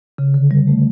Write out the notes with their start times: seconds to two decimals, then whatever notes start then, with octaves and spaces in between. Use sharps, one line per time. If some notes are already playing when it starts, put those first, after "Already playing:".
0.18 C#3
0.34 D3
0.51 G3
0.67 A3